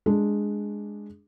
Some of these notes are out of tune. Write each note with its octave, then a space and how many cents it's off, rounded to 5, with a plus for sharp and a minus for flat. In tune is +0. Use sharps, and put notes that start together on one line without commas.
G#3 +0 D4 +0